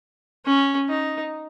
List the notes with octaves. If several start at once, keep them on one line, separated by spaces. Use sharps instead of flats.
C#4
D#4